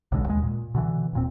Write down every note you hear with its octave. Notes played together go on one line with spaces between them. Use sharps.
B1 B2 D3 G#3
D#2 G#3
A#2
B2 D3 E3
D#1 A#2 C4